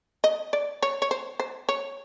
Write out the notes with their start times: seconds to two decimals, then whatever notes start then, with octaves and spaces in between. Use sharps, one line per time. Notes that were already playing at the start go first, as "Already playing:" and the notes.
0.24 D#5
0.53 D5
0.82 C#5
1.02 C#5
1.11 C5
1.40 C5
1.69 C#5